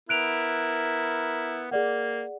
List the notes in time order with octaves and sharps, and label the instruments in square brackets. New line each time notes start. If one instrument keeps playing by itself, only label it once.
[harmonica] B3 E4 A#4 [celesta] F#6 D7 F7
[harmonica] A#3 [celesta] G#4 D5 F#5